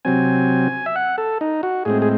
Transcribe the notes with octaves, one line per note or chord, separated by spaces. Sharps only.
C3 F#3 C4 G#5
E5
F#5
A4
D#4
F#4
A2 G#3 C4 G#4
G#4